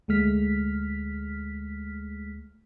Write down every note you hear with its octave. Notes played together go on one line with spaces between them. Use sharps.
D2 G#3 A3 F6 B6